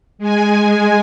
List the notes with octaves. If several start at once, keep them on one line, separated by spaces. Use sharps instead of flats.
G#3 G#5